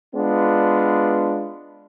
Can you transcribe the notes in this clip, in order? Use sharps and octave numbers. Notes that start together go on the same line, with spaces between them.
G#3 B3 D4 F4